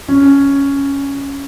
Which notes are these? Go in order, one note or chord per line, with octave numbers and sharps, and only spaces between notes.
C#4